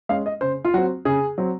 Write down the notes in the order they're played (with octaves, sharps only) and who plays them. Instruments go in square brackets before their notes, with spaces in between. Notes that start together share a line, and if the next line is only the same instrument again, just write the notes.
[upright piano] G#3 C#4 F5
D#5
C#3 C5
F4
F#3 C4 F#4
C#3 G#4
F#3 C4